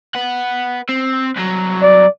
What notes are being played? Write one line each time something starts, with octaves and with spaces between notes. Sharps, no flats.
B4 F#5
C4
C2 F#3
D5